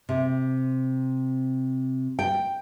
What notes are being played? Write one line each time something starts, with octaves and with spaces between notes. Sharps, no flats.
C3
G5